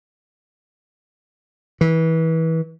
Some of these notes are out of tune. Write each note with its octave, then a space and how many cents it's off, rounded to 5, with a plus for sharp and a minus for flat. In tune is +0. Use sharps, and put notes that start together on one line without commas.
E3 -25